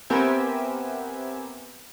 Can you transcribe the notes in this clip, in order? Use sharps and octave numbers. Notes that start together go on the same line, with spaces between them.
B3 C4 G4 A#4 E5 G#5